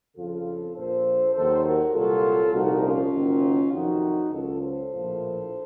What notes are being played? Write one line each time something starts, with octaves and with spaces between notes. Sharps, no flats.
F2 C#3 F3 F4 A4
A#1 A#2 F3 A4 C5
D#2 D#3 F#3 A4 C5
F#4 A#4
C2 A#2 F#3 F4 A4
C2 A#2 F3 D#4 F#4
C#4 F4
F#1 F#2 D#3 F#3
F2 C3 D#3 F#3 D#4 F#4
C#2 C#3 F#3 F4 A4
A4 C5
A#1 A2 F3